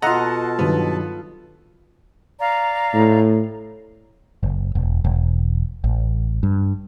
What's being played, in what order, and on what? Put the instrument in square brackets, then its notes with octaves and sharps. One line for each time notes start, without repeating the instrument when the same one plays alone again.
[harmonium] B2 A5 [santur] F4 A4 [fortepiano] D#5 F#5 A#5
[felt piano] G2 D#3 F#3 [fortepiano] B3
[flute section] D5 F5 A#5
[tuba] A2
[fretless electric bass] F#1
E1
E1
A1
G2